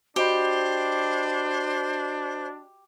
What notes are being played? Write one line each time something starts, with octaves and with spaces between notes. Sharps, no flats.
D4 F#4 G4 C5 D#5 B5